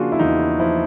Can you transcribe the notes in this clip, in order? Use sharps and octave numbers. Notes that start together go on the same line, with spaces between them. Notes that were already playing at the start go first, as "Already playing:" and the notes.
Already playing: C#3 F3 A#3 D4 F4 F#4 G#4
E4
E2 D#4
F3 E4